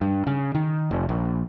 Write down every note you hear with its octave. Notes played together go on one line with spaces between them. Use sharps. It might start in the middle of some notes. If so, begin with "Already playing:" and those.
G2
C#3
D#3
F1
A#1